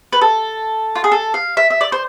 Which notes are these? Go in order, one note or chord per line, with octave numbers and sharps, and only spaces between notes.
B4
A4
F4
G#4
A4
F5
E5
E5
D5
C5